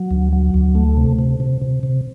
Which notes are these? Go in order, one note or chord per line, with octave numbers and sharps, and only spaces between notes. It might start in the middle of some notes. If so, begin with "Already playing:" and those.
Already playing: F#3
D2
F#3
D2
A3
C3
C3
C3
C3
C3